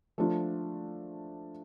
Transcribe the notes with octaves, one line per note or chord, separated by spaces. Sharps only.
F3 A3 D4 F4